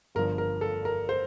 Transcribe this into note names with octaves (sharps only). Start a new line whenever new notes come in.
G1 G2 F3 A#4
A#4
A4
A#4
C5